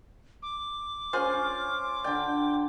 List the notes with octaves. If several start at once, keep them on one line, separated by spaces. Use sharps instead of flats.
D6
C#4 F4 G#4 C5
D3 D5 G5